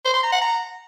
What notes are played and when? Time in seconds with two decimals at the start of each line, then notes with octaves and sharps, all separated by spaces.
0.05 C5
0.14 C6
0.23 A#5
0.32 F#5
0.41 A#5